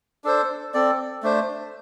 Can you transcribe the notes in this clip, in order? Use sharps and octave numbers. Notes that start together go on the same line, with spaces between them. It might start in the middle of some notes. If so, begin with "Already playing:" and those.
D4 A4 C5
C4 A4 D5
A3 D4 C5